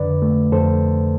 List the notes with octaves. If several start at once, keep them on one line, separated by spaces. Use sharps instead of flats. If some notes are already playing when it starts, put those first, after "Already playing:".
Already playing: F2 D3 B4 D5
A3
F2 A4 C5